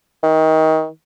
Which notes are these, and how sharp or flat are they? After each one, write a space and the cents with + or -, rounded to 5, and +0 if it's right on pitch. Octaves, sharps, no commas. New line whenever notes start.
D#3 +25